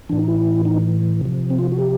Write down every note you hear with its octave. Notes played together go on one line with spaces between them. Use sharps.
A2 E3 D4
D#4
E4
D#4
C3 F3
C4
F4
F#4
G4